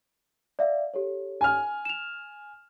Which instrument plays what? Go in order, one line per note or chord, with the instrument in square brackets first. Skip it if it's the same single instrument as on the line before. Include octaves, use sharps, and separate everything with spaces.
[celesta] D5 E5 F5
G4 A4 C#5
[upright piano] G#5 F6
[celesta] E7 F7